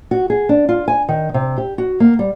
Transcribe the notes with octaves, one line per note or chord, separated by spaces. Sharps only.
F#4
G#4
D4
F4
G#5
D#3
C3
G4
F#4
A#3
G3